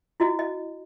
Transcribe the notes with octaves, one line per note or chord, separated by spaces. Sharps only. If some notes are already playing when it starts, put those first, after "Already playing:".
E4 F#4 D#5
D#5